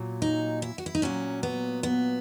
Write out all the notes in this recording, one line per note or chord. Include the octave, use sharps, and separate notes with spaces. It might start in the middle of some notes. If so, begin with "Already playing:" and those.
Already playing: A#2 F#3
D#4
E4
F#4
E4
D#4
A#2 F#3 C#4
B3
B3